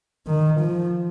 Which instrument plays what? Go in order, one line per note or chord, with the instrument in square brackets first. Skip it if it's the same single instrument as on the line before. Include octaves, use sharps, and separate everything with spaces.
[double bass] D#3
F3